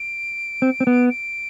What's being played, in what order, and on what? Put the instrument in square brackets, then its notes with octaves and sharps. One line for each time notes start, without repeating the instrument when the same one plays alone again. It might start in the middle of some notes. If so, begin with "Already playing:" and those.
Already playing: [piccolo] D7
[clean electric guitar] C4
C4
B3
[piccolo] D7